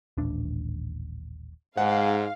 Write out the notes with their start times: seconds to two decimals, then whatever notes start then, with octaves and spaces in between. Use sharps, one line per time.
0.18 D#1 A1 D4
1.77 G#2 F5 F#5